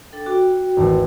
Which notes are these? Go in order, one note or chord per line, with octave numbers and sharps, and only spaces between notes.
D4 A4 G5
F#4 G5 D6
G#1 E2 A3